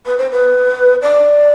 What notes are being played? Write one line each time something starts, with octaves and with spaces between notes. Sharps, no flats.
B4
C5
B4
D5